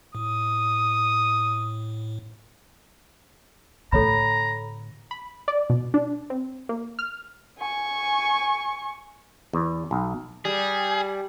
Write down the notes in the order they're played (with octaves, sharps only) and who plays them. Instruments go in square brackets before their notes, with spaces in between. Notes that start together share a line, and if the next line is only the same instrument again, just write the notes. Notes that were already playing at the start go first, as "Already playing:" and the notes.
[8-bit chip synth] A2 [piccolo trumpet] D#6
[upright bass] A2 D3 [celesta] A4 C#5 B5 [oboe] A#5
[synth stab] B5
D5
B2
D4
C4
A#3
F6
[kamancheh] G#5 C#6
[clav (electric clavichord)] E2
B1
[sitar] G3 [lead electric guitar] G#4